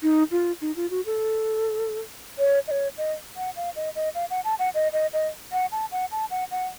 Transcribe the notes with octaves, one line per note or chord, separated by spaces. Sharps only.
D#4
F4
D#4
F4
F#4
A4
C#5
D#5
C#5
D#5
F#5
F5
D#5
D#5
F5
F#5
A5
F#5
D#5
D#5
D#5
F#5
A5
F#5
A5
F#5
F#5